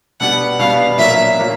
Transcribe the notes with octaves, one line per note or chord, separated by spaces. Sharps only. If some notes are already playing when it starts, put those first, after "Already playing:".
B2 G3 B3 D4 F#5
B2 G3 B3 D4 F5
A#2 F#3 A#3 D4 E5
A#2 F#3 A#3 D4